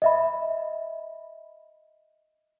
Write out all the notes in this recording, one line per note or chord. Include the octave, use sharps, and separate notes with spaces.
D#5 E5 B5